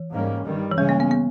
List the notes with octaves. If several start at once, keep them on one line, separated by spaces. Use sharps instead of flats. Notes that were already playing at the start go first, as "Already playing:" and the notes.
Already playing: E3
G#2 G3 A#3 C#4
G2 D#3 G3
E3
C#3 G3 G#3 C#4
A#3
B3
B3